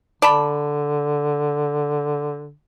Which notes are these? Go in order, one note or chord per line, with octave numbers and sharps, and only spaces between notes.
D3 D5 A5 B5